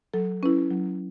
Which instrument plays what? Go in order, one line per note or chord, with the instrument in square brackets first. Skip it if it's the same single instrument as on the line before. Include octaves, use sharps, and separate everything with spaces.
[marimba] F#3 A4
C#4 E4 B4
F#3